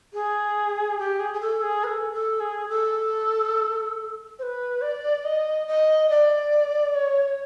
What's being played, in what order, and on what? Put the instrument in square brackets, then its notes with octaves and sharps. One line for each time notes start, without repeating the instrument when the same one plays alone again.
[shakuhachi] G#4
G4
G#4
G#4
A4
G#4
B4
A4
A4
G#4
A4
C5
B4
D5
D#5
D#5
D5
C#5